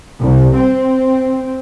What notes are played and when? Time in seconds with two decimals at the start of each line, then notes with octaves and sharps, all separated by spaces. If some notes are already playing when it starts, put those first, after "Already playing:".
0.20 C2
0.55 C4